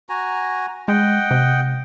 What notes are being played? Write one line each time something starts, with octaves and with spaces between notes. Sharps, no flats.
F#4 G#5 A#5
G#3 D#5 F#5 G5
C3